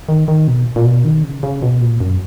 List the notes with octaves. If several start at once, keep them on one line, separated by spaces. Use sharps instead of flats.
D#3
D#3
B2
A#2
B2
D#3
C#3
C#3
B2
A#2
F#2